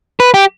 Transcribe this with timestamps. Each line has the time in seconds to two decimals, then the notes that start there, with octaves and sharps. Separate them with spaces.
0.20 B4
0.34 G4